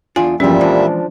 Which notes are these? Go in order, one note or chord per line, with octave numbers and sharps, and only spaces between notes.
E2 D4 F4 G#5
E2 G2 A#2 F3 G3 C#4 E4 E5
E3 F3 G#3 D4